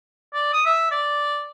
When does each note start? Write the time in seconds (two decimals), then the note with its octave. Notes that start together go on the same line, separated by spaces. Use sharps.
0.34 D5
0.53 D#6
0.65 E5
0.91 D5